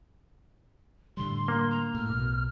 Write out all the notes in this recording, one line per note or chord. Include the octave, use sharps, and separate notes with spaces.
A2 D3 G3 C6
A#3
A#5
A2 F6
B1 B2